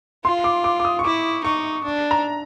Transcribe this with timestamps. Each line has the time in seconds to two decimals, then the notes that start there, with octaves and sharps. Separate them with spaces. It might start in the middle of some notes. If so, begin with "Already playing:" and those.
0.25 F4 C6
0.44 D6
0.64 D6
0.80 D6
0.85 D#6
0.99 C#6
1.04 E4 D6
1.44 D#4 C#6
1.84 D4
2.11 A#5